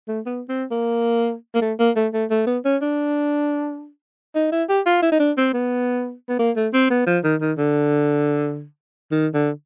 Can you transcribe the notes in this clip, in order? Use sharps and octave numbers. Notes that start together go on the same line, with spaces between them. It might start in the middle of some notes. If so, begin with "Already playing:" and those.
A3
B3
C4
A#3
A#3
A3
A#3
A3
A3
A3
B3
C#4
D4
D#4
E4
G4
F4
E4
D#4
D4
C4
B3
B3
A#3
A3
C4
B3
F3
D#3
D#3
D3
D#3
D3